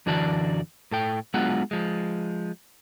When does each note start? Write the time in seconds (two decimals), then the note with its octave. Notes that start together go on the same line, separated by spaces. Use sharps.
0.06 F#2 D3 E3 F#4 D5 A5
0.91 A2 A4 G5
1.34 F#3 G#3 B3 D4 F4 F#5
1.71 F3 G#3